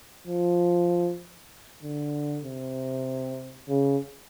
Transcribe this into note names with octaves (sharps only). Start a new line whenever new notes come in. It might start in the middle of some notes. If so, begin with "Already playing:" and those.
F3
D3
C3
C#3